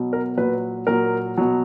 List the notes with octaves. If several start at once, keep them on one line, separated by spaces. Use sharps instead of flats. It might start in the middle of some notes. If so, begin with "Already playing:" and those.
Already playing: B2 F#3
A#4
A#2 F#3 B4
A#2 F#3 A#4
B2 F#3